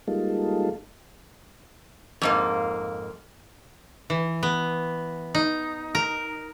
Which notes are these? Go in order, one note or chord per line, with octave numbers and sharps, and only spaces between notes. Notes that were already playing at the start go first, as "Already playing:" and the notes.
G3 G#3 A#3 D#4 F4 A4
F2 G#2 A#3
E3
B3
D#4
A#4